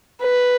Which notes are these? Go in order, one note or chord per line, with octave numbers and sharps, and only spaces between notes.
B4